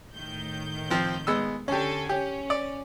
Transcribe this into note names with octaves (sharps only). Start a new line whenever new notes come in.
A2 D#3 G6
F3 C4
G#3 B3 E6
D3 C#4 G4 A4 G#5
C#4 G4
D5